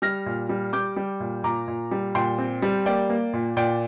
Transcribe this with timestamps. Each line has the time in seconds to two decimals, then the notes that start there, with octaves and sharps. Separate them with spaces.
0.02 G3 F6 A#6
0.26 A#2
0.49 G3
0.73 G3 D6 G6
0.96 G3
1.20 A#2
1.44 A#2 A#5 D6
1.68 A#2
1.91 G3
2.15 A#2 G5 C6
2.38 C4
2.62 G3
2.86 A#3 D5 G5
3.10 A#3
3.33 A#2
3.57 A#2 D5 G5